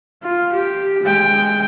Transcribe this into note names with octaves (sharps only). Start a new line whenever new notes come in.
F4
G4
G#3 G5